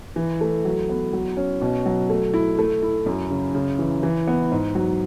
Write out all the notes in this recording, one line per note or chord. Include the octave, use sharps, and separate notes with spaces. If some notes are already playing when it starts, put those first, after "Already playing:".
E3
A3
F#3
B3
F#3
C#4
B2
F#3
A3
E4
A3
E4
F#2
C#3
C#3
E3
E3
B3
G#2
F#3